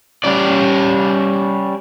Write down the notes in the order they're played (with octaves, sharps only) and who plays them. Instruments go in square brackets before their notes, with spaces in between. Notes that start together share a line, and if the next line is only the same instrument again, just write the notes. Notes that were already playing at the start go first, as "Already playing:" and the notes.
[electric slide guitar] G3 C#4 D5